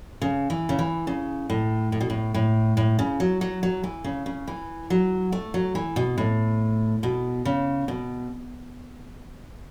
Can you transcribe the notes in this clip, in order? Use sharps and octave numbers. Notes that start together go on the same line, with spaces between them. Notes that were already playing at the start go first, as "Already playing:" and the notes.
C#3
E3
C#3
E3
C#3
A2
A2
B2
A2
A2
A2
C#3
F#3
F#3
F#3
E3
C#3
C#3
E3
F#3
A3
F#3
E3
B2
A2
B2
C#3
B2